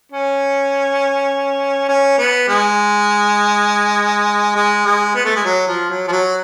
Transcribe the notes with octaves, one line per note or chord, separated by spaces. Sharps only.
C#4
C#4
B3
G#3
G#3
G#3
B3
A3
G#3
F#3
F3
F#3
F3
F#3